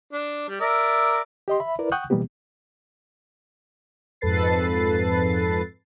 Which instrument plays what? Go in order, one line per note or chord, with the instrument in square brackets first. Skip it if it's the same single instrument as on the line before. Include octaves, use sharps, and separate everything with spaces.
[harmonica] D4
G3
A#4 D5 E5
[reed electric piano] G4 D#5 C6
E5 B5
E4 A#4 B4 D5
F#5 G5 C#6 D#6 F#6 G6
B2 E3 G3 A#3 B3 G4
[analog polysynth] F2 G#2 A4 B4 A6 C7